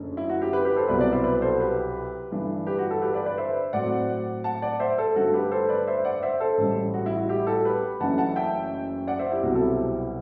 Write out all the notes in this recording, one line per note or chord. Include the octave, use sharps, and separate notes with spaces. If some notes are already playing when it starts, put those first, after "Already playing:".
Already playing: F#1 F#2 D3 A3
E4
F#4
E4 G4
G4 B4
G4 B4
A4 C5
C2 B2 F#3 B3 E4 B4 D5
B4 D5
C5 E5
B4 D5
A4 C5
G4 B4
G1 G2 E3 A3 D4
G4 B4
F#4
F#4 A4
G4 B4
B4 D5
B4 D5
C5 E5
A2 F#3 C4 D5 F#5
F#5 A5
D5 F#5
C5 E5
A4 C5
G2 D3 A3 F#4 A4
G4 B4
A4 C5
B4 D5
C5 E5
D5 F#5
C5 E5
A4 C5
A1 A2 G3
F#4
E4
F#4
E4 G4
F#4 A4
G4 B4
F#1 F#2 E3 A3 D4 F#5 A5
F#5 A5
E5 G5
D5 F#5
C5 E5
E4 G4
C2 B2 F#3 C4 F#4
A4
E4 G4